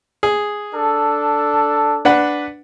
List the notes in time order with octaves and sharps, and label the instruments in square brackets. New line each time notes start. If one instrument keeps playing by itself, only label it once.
[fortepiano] G#4
[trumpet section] D4 A4
[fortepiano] D4 B4 F#5